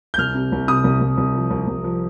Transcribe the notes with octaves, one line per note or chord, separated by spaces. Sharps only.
G6
C2 F6
C3
C2
C3 D#6
C2
C2
C2
F3
C2
C2
F3